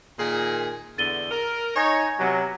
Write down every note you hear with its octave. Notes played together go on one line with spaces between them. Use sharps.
A#2 D#3 G#4
E2 D3 A6 D#7 G7
A#4
D#4 C#5 G#5 G#6 A#6
C3 F#3 B3